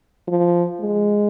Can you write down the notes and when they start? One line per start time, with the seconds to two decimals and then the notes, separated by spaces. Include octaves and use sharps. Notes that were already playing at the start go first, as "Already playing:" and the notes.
0.28 F3
0.80 G#3